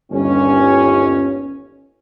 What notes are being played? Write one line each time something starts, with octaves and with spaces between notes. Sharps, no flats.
G1 D#2 C#4